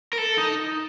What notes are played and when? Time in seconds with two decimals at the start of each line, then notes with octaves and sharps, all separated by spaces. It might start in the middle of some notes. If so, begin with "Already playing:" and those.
0.13 A#4
0.18 A4
0.38 D#4